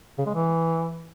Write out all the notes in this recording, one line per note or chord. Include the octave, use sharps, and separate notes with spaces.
C#3
G#3
E3